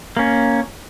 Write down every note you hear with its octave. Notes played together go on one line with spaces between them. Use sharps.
A#3 C#4